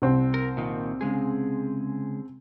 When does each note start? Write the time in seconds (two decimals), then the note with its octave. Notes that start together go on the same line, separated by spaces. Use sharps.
0.02 C2 C4
0.34 A#4
0.57 A#2 D#3
1.01 C#3 G#3 G#4